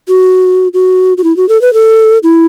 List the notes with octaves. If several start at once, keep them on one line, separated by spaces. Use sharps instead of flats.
F#4
F#4
F#4
E4
F#4
A4
B4
A4
E4